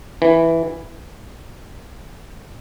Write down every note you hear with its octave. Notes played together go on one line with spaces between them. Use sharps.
E3